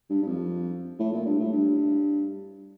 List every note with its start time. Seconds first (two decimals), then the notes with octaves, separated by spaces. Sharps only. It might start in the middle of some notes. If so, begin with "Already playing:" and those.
0.10 G2
0.22 G2
0.27 F2
0.99 A2
1.12 A#2
1.26 G2
1.39 A2
1.52 G2